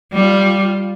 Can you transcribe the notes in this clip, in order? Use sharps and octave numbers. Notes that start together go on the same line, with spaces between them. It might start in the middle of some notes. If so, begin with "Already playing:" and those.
G3 F4